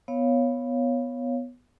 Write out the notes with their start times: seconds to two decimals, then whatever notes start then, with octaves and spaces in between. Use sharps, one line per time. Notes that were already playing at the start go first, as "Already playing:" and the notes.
0.08 B3 C#5 F5